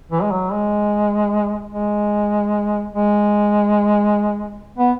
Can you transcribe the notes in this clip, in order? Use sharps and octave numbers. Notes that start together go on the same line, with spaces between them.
E3
G#3
F#3
G#3
G#3
G#3
B3